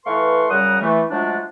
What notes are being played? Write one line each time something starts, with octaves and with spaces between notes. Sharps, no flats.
E3 A3 B4 F5 C6 C#6
C#3 F#3 G3 A#4 F#5 D#6
E3 A3
F3 F#3 G#3 A3 D4